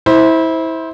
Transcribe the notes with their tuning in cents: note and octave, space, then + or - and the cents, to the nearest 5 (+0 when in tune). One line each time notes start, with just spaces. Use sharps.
E4 -25 C5 +0